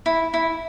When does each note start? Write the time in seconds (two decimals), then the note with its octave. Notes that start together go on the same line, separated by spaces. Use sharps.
0.06 E4
0.34 E4